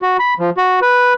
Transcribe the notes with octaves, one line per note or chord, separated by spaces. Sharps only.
F#4
B5
F3
F#4
B4